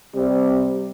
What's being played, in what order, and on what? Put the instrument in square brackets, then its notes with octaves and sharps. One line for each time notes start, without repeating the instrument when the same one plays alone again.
[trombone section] C3 G3